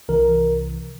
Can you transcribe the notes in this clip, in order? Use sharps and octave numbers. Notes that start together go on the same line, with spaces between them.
C2 C3 E3 A#4